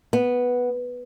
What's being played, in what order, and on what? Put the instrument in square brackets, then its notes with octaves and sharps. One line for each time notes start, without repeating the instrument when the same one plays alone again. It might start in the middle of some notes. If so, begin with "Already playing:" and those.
[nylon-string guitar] B3